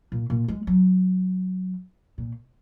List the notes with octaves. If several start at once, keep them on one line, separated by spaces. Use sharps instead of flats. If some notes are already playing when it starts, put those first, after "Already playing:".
A#2
A#2
G#3
F#3
A#2